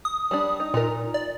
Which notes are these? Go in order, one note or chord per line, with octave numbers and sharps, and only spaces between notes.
D#6
G3 D4
D#4
A#2 D#4 A#4
D5